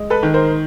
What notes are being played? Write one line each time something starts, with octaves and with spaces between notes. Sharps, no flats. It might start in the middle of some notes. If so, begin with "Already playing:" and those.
Already playing: G#3
A4 B4
D#3
A#4 C5